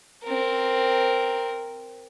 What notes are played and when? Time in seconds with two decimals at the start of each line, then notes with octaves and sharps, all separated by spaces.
0.24 C4 A#4